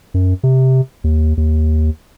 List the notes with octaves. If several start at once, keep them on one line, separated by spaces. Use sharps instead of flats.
F#2
C3
D#2
D#2